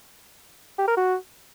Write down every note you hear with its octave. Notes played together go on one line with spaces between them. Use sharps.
G4
A#4
F#4